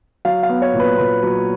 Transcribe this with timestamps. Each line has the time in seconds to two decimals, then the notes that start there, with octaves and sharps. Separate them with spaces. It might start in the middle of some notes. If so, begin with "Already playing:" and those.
0.25 F#3 F5
0.43 F5
0.49 B3
0.62 C#5
0.74 A#2
0.80 B4
0.98 A#2 B4
1.23 F#3